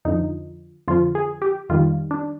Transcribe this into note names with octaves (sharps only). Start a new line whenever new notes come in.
F2 D3 F3 D#4
F2 D3 F3 F4
G#4
G4
F2 D#3 G3 F4
D4